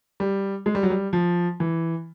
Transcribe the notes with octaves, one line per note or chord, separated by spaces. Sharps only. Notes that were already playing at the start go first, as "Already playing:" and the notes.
G3
G#3
G3
F#3
G3
F3
E3